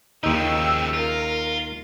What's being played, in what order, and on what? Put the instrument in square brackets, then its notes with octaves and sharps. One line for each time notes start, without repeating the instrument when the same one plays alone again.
[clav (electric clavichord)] D#2 D#4 [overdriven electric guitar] C#3 F3 [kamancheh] G5 E6
[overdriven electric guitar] F4 [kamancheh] A#4